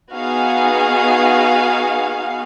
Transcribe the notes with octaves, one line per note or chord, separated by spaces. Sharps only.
B3 D#4 F#4 G#4 F5 F#5